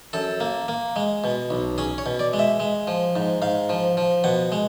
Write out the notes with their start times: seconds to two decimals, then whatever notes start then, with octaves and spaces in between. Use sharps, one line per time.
0.13 F#2 A4
0.40 A#3
0.68 A#3
0.96 G#3
1.24 B2
1.50 B1
1.78 C#4 G#4
1.98 C#5
2.06 B2
2.19 D5
2.33 G#3
2.39 E5
2.60 G#3
2.87 F3
3.16 G#2
3.42 G#2 F5
3.69 F3
3.97 F3
4.24 B2 F#5
4.52 G#3